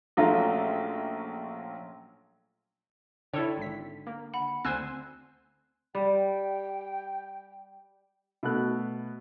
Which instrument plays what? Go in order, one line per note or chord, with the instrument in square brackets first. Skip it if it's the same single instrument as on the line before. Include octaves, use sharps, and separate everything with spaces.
[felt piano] A#1 F#3 A3 C#4 F4 A#5
[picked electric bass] D3 [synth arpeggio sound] E4 A4 C#5 [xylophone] G5 G#6
[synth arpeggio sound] G#1 B6
A#3
[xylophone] F#5 B5
[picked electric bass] D2 C4 [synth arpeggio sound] C5 G#5 E6 [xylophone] F#6
[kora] G3 [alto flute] G5
[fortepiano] B2 A3 F#6